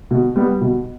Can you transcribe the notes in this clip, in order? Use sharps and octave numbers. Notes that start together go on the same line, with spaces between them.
B2
G3 B3
B2